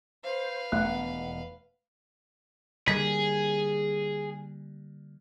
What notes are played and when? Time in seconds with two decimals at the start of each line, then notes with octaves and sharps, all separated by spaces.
0.24 B4 C5 F5
0.72 E1 D#2 A3 B3 F#5
2.88 D3 G3 A#3 G#4 B6